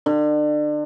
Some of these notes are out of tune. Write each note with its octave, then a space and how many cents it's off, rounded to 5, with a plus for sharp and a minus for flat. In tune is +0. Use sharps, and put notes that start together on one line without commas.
D3 +35